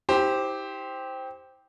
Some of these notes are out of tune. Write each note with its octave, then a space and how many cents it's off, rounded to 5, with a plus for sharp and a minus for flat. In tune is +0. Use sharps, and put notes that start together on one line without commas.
E4 -45 G4 +0 C5 +0